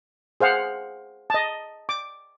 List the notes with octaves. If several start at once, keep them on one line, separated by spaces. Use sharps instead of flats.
G#4 C5 F5 F#5
D#5 A5
D6